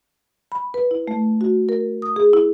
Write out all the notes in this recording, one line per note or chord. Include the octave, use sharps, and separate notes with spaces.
B5
B4
E4
A3
F#4
A#4
D#6
G#4
E4